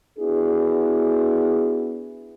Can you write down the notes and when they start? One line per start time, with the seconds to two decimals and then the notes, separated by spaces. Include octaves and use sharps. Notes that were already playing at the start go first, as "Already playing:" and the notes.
0.19 B3 D4 E4 F#4 G#4